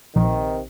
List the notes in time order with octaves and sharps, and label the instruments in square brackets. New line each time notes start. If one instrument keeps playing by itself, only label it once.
[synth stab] A#1 [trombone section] C3 D#3